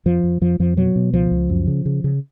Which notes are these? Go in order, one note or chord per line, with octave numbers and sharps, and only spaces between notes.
F2 F3
F2
F2 F3
F2 F3
B2 F#3
B2
C#2 F3
C#2
F#2
C#3
C#3
C#3